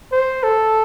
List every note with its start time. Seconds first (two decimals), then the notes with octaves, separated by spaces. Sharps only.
0.12 C5
0.43 A4